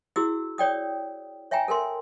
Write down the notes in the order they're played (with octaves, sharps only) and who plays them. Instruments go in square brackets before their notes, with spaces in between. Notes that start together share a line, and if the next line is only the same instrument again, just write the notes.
[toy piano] E4 F#4 G#4 E6
C#5 D5 G5 D#6
C#5 E5 G5 G#5 A#5
A4 A#4 G#5 C6